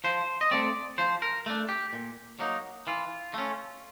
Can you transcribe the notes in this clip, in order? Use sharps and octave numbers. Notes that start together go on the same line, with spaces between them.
F3 C5
D#5
A3 C4 D5
F3 C5
A#4
A3 D4
G4
A#2
F#3 A#3 D#4
E3 F4
A3 C#4